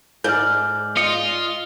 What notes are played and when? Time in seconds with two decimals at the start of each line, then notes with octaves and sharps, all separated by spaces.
0.24 G#2 D5 F6 G6
0.97 F4 D#5 C#7